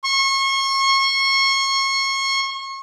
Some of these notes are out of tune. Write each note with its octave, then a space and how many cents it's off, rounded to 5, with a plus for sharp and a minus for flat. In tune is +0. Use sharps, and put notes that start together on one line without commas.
C#6 -35